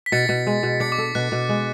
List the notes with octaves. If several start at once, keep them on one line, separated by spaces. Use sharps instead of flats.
B6
B2 A6 C#7
B2
G#3
B2
D4 A6 C#7
D6
A4
B2 F#6
B2
G#3